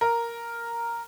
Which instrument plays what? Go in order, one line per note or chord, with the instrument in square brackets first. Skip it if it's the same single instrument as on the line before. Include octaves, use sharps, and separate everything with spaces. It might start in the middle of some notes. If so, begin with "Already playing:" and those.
[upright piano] A#4